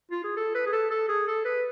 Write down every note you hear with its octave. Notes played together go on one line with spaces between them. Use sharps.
F4
G#4
A4
B4
G#4
A4
A4
G#4
A4
B4